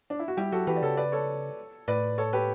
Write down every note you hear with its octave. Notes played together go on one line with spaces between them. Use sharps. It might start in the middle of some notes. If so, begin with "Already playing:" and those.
D4
E4
F#4
G3 E4 G4
F#3 F#4 A4
E3 G4 B4
D5
C#3 A4 C#5
B4 D5
A4 C#5
A2 B4 D5
A4 C#5
G4 B4